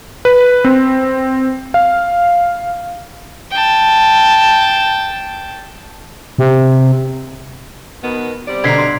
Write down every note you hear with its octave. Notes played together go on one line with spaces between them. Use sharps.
B4
C4
F5
G5 A5
C3
B2 D#3 B3
C3 G3 D5
B2 D3 A#5 G#6 B6 C7
C6